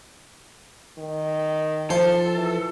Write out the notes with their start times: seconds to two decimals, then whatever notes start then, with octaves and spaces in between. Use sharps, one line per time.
0.98 D#3
1.90 F3 A4 C5
2.35 E3